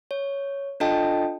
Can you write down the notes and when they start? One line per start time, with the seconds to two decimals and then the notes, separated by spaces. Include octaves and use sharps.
0.11 C#5
0.80 D4 F4 A4 D#5 G5 A5